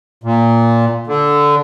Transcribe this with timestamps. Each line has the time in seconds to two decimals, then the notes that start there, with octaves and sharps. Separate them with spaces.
0.24 A#2
1.07 D3